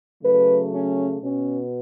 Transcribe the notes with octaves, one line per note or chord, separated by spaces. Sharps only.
C#3 F#3 A3 B4
C#4
B2 B3 C#4